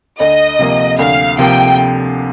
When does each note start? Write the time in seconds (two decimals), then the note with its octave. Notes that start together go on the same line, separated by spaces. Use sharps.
0.20 D2 D#5
0.59 C3 F3 A#3
0.98 D2 F5
1.39 C3 F3 A#3 G5